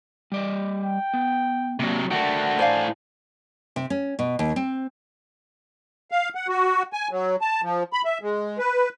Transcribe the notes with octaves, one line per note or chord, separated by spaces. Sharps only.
G3 D5 D#5
G5
B3
C3 F#3 A#3 D4
A3 D4 F#4 A#4 F#5 G5
A2 C5 D5 F5 G#5
C3
C#4
B2
D#2
C4
F5
F#5
F#4
G#5
F#3
A5
F3
B5
E5
G#3
B4